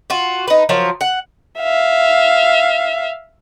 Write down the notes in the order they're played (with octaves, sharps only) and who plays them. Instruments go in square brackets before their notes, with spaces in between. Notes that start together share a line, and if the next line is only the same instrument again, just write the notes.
[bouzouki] F4 F#4
D#4 B4
F3 F#3 A#4
F#5
[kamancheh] E5 F5